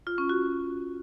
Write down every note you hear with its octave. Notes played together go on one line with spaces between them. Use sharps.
F4
C#4
F#4